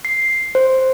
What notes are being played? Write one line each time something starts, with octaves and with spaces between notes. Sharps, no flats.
C7
C5